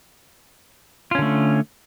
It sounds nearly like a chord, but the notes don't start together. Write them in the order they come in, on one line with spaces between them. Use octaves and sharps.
F4 C#4 D3 A3